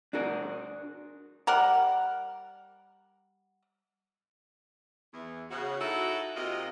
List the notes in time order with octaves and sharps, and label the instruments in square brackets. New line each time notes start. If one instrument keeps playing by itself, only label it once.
[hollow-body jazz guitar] D4 F#4 G#4 A#4
[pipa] G3 A#4 F#5
[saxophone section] E2 E3
[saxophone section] C#3 [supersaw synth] F#4
[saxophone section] D#4 E4 A4
[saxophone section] C3 A#3 F4 [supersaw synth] D#5